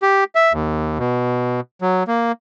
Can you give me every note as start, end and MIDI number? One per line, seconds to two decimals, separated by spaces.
0.02 0.24 67
0.35 0.53 76
0.53 0.98 39
0.99 1.60 47
1.82 2.03 54
2.07 2.32 58